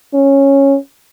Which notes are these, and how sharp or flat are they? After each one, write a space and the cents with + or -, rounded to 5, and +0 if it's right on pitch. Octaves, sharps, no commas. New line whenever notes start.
C#4 -10